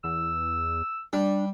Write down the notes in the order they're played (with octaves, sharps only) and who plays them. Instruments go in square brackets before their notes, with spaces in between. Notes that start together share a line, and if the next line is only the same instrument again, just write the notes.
[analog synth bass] E2 [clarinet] E6
[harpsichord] G3 [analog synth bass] D4